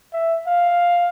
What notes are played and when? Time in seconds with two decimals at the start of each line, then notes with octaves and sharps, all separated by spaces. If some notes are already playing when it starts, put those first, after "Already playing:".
0.13 E5
0.47 F5